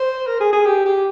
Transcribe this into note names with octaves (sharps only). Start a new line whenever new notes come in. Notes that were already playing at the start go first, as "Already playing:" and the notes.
Already playing: C5
A#4
G#4
G#4
G4
G4